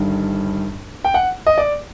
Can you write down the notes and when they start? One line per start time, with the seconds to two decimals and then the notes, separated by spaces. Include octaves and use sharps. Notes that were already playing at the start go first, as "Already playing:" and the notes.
Already playing: G1 G2 D#3 G3
1.05 G5
1.14 F#5
1.47 D#5
1.58 D5